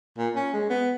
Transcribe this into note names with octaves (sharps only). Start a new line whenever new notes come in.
A#2
C#4
G#3
B3